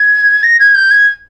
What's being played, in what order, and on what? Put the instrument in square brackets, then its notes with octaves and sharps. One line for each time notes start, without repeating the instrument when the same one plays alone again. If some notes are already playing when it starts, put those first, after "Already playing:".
Already playing: [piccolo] G#6
A#6
G#6
G6
G#6